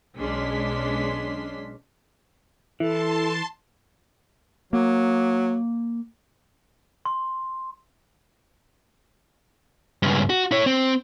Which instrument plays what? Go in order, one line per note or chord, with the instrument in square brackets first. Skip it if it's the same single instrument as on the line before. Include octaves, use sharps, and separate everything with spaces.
[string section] B1 G#3 C#4 D4 C6 B6
[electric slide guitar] E3 [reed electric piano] E4 [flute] A4 [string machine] A5 C6
[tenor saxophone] F#3 [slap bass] A#3
[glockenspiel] C6
[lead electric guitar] C#2 G2
F#4
E4 C#5
C4